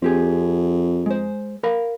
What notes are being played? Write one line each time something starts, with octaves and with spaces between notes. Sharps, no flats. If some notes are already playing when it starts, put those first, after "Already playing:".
F2 C4 G4 G#4
G#3 C5
A#4 F5 B5